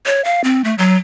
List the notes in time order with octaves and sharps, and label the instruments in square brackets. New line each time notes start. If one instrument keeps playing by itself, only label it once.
[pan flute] C#5
F5
C4
A3
F#3